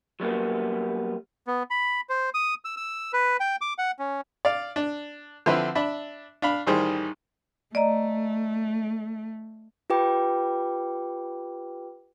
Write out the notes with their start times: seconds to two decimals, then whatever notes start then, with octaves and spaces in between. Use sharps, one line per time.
0.20 F#3 G3 A#3 B3
1.47 B3
1.71 B5
2.09 C5
2.34 D#6
2.65 E6
2.77 E6
3.13 B4
3.40 G5
3.61 D6
3.78 F#5
3.99 C#4
4.45 D5 F5
4.76 D4
5.46 D3 F3 C4 E4 B4 C5
5.75 D4 E5 B5
6.42 D4 F5 B5
6.67 A1 D#3 G3 G#4 C5
7.75 A3 D5 D#5 A#5
9.90 F4 G4 B4 G5 D6